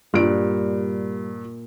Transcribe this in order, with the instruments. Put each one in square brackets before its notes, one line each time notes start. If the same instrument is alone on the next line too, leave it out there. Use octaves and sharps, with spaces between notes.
[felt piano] G2 D7 [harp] A#2 F#6 [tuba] G3 [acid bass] F4